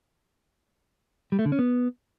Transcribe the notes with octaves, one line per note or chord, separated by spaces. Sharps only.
G3
A3
D3
C#4
B3